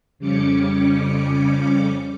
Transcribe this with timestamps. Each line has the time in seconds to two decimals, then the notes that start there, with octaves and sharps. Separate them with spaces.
0.19 F2 C#3 G3 C#4 D6 C#7